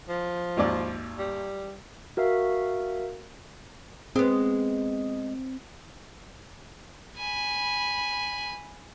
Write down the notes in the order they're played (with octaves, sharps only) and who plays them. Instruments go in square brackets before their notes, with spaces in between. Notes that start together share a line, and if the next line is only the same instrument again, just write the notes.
[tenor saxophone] F3
[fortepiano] G#1 D#2 D5
[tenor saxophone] G3
[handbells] F#4 A#4 E5 F5
[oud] G#3 B3 [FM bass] C4
[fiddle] G#5 B5